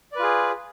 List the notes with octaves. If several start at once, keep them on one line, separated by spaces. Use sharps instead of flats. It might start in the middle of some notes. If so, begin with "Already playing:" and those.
F4 G#4 B4 D5